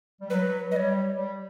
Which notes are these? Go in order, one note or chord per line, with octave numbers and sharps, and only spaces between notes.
G3
F#3 B4
G3 D#5
C#5
G3